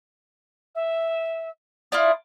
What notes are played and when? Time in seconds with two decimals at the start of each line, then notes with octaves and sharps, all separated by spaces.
0.75 E5
1.92 D4 E4 F4 D#6